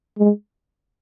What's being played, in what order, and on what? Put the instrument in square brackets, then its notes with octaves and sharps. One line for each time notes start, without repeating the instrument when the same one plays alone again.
[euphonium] G#3